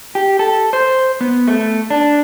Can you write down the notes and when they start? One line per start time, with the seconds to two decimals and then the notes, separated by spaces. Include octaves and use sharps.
0.15 G4
0.39 A4
0.73 C5
1.21 B3
1.47 A3
1.90 D4